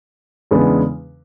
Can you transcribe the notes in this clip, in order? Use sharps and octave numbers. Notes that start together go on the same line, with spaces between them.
E2 C#3 G#3 B3 D4